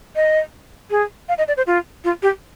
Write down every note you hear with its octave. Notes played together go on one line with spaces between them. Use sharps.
D#5
G#4
F5
D#5
D5
C5
F4
F4
G4